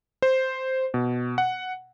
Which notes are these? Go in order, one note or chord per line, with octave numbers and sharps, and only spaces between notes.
C5
B2
F#5